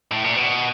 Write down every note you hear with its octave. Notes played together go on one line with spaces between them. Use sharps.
A2
A#2
B2